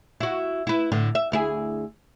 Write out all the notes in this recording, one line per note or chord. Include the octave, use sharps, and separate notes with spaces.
E4 F#4
E4 B4
A2 D3
E5
D2 E4 G#4